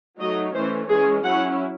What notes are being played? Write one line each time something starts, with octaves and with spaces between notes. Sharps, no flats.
F#3 A3 D#4 D#5
E3 A3 C#4 C5
E3 G#3 C#4 G#4
F#3 C#4 E4 F#5